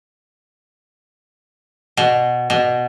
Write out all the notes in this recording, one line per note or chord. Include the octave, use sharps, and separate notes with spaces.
B2
B2